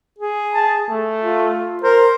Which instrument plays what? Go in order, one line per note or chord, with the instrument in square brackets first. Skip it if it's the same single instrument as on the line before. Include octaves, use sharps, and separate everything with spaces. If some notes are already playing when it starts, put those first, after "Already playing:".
[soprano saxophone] G#4
[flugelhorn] A5
A3
[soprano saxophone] F4
[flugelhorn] A#4 [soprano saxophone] C5